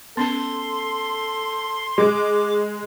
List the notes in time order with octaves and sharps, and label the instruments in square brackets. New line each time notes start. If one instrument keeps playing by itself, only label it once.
[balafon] B3 C#4 A5 [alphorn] A4 [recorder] C6
[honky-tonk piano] G#3 [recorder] D6